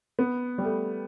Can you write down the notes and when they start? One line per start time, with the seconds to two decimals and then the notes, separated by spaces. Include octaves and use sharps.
0.19 B3
0.58 G3
0.65 A3